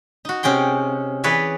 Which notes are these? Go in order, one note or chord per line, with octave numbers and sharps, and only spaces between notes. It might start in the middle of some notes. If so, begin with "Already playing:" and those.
D#4 F#4
C3 C#4 G#4 G5 C6
E3 G#4 B4 C#5 D5 E5